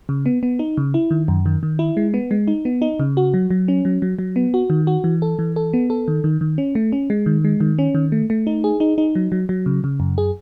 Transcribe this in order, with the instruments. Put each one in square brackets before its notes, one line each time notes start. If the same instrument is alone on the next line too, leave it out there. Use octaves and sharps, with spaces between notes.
[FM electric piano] C#3
B3
B3
D#4
C#3
E4
D#3
F#2
D#3
D#3
E4
G#3
B3
G#3
D#4
B3
D#4
C#3
F#4
F#3
F#3
C#4
F#3
F#3
F#3
B3
F#4
D#3
F#4
E3
A4
E3
A4
B3
A4
D#3
D#3
D#3
C#4
A3
C#4
G#3
D#3
G#3
D#3
C#4
D#3
A3
A3
D#4
G#4
D#4
D#4
F#3
F#3
F#3
C#3
C#3
F#2
G#4